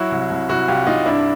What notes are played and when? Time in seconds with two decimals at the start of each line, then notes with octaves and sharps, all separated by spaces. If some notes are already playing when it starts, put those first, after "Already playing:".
Already playing: F#3 E4 F#4
0.11 C2
0.30 C2
0.49 C2 E4 F#4
0.68 C2 F4 G4
0.87 C2 D#4 F4
1.06 G2 D4 E4